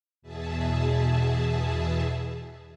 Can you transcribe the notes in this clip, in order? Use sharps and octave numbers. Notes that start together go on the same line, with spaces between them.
E2 B2 G#4 E5 A5